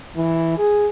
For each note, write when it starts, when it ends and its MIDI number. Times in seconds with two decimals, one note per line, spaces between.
0.16 0.55 52
0.58 0.87 68